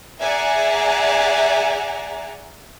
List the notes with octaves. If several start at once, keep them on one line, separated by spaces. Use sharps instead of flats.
G#4 D5 E5 F#5 G#5 A#5